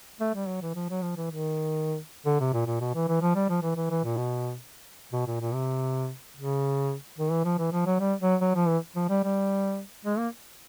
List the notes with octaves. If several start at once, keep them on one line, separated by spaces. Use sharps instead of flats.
A3
G3
F#3
E3
F3
F#3
F3
E3
D#3
D3
C3
A#2
A#2
B2
E3
E3
F3
G3
F3
E3
E3
E3
A#2
B2
B2
A#2
A#2
C3
C#3
D#3
E3
F3
E3
F3
F#3
G3
F#3
F#3
F3
E3
F3
G3
G3
G#3
A#3